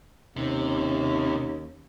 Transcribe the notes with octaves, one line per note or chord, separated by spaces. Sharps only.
D#2 C3 C#4